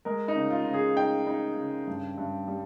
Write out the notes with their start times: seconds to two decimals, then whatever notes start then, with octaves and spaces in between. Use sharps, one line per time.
0.05 G#3 A#4
0.28 D#4
0.35 C#3
0.51 F4
0.66 C#3
0.74 G#4
0.96 D#4 G5
1.27 D#4
1.57 C#3
1.87 G2
2.17 G2
2.48 G3